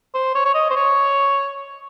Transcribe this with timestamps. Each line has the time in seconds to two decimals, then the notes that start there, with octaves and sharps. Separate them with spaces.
0.14 C5
0.35 C#5
0.45 C#5
0.55 D#5
0.70 C5
0.76 C#5